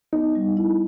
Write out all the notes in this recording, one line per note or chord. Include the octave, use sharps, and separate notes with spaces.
B3 D#4
G3
E4